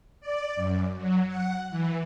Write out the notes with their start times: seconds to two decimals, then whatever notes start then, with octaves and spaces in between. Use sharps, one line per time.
0.21 D5
0.56 F#2
0.96 F#3
1.27 F#5
1.70 E3